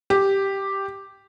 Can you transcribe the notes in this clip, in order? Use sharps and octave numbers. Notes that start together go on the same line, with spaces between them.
G4